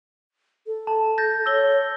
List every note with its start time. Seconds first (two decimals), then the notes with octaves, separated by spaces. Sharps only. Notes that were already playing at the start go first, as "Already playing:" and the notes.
0.67 A4
0.87 A5
1.18 G6 A6 A#6
1.46 C#5 E6 G7